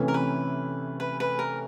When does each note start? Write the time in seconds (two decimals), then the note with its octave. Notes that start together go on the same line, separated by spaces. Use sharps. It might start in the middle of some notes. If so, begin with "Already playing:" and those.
Already playing: C3 E3 A3 C#4
0.08 A#4
0.14 B4
1.00 B4
1.20 B4
1.39 A#4